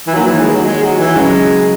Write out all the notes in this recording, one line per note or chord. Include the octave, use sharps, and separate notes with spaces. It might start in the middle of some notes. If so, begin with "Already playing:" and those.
E3
D#3 F#3 A#3 D#4
E3
G#3
F#3
G#3
F#3
E3
C#3 F#3 G#3 C#4